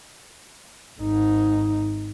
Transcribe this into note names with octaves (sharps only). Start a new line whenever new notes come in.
G#1 D#4